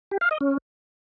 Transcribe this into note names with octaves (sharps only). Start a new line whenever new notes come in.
G4
F5
D#5
C#4